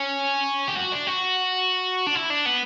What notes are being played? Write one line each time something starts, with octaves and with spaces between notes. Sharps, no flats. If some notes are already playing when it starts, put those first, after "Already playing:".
Already playing: C#4
G4
F#4
D4
F#4
D4
E4
D4
B3